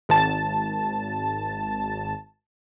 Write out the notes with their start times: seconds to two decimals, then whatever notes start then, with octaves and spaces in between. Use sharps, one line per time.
0.09 G#1 A5